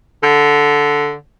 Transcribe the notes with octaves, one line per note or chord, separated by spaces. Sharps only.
D3